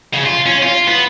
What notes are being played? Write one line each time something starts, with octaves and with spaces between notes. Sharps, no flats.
C#3
F4
C#4
F4
B3